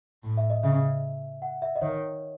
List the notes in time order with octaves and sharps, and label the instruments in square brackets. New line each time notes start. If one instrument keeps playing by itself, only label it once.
[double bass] A2
[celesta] E5
D#5
[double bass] C#3 [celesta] E5
[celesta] F#5
E5
D#5
[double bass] D#3 [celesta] C#5